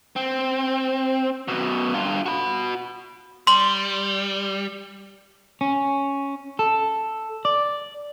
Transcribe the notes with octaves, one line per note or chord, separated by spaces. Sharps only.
C4
F#2 B2
G2 F4
F#4 B5
G3 C6 F#7
C#4
A4
D5